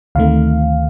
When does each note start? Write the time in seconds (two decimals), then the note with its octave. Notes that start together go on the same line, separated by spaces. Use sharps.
0.15 D2 C3 D#3 A3 F5